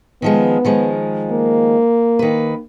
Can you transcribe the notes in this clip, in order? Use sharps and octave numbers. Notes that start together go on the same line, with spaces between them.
D#3 F3 G#3 B3
D#3 F3 G#3
A#3
D#3 B4